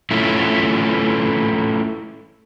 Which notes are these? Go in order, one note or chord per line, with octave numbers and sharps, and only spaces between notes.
A3 C#4 E4 F4